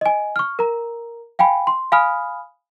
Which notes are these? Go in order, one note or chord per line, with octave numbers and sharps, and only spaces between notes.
D#5 G#5
C#6 F6
A#4 A#5
F5 G5 G#5 B5
C6
F5 G#5 B5 D#6 F6